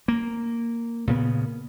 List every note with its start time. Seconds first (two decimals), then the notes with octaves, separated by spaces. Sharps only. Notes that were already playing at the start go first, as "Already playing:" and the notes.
0.08 A#3
1.07 A#2 C#3 B3